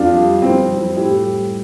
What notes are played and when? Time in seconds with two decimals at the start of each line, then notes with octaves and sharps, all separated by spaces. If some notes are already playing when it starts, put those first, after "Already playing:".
Already playing: F2 D4 F4
0.15 G3
0.42 F2 C4 E4
0.69 F3
0.96 A2 E4 G4
1.23 G3